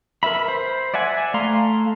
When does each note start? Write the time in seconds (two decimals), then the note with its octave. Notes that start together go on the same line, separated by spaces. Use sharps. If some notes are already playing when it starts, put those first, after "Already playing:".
0.23 A#4 B4 E5 B5
0.48 C5
0.94 D5 E5 F#5 G#5
1.34 A3 F5 A#5 C6